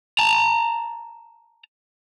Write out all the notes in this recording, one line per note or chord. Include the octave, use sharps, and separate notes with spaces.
A5 A#5